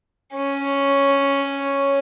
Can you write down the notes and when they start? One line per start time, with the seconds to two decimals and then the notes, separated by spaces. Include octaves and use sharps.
0.35 C#4 C#5